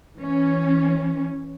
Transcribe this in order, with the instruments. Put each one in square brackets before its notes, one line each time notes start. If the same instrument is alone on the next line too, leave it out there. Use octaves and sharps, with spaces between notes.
[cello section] E3 C#4